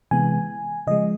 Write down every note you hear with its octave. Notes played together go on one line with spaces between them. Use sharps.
C3 E3 G#3 B3 G#5
C#3 F3 G#3 D#5